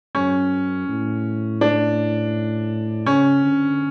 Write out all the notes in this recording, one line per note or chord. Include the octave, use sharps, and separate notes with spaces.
F#2 C#4
A2
D4
C#3 C#4
D3